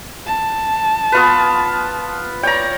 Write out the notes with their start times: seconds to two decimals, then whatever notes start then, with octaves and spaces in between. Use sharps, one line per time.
0.26 A5
1.12 B3 F4 B4
2.43 C#5 D5 G5 A#5